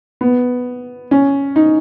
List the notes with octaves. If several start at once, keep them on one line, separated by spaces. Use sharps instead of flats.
B3
C#4
D#4